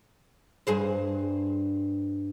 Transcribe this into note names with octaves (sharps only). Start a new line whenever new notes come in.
G2 G#4 C5